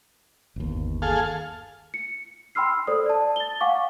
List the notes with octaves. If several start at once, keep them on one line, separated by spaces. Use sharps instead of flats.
G1 D#2
G#4 A4 F5
C#7
G5 B5 C6 E6 F6 C7
A4 C5 D5 D#6
D5 A5
A6 G7
F5 F#5 G#5 C#6 D6